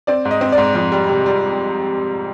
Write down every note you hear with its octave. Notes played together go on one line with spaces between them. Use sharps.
C4 D5
G#2
D#5
C4
D5
G#2
F2
G3
C3
G3